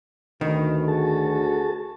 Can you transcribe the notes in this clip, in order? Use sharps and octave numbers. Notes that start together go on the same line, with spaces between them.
D2 B2 D#3
F#4 G#4 A4 A5